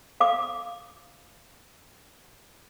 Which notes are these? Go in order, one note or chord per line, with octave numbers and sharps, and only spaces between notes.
F5 D6